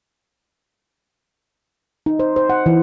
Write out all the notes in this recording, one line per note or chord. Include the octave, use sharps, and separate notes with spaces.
D#4
C5
C5
F#5
E3